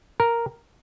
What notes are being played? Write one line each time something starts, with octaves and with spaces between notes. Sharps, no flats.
A#4